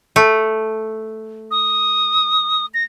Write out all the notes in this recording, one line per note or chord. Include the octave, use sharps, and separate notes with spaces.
A3
D#6
A#6